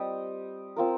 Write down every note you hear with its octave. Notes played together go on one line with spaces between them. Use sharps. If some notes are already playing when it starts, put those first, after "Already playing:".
Already playing: G3 C4 G4 D#5
C4 F4 A#4